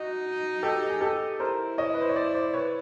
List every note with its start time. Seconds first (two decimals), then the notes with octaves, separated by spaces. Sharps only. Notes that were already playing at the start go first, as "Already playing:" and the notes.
Already playing: D#4 F#4
0.63 G4 A4
0.90 G#4
1.01 G4 A4
1.39 E4 A#4 C5
1.78 C#5 D#5
1.94 B4
2.02 C5
2.09 C#5
2.16 C5 D5
2.35 C5 D5
2.54 B4 C#5